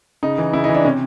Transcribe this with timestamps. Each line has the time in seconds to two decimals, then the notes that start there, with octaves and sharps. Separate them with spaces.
0.23 C#3 D#4
0.38 E3
0.53 C#3 E4
0.64 D#4
0.69 E3
0.74 D4
0.84 C3 C#4